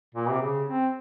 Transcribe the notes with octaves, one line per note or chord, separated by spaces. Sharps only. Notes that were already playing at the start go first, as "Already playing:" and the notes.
A#2
C3
C#3
C4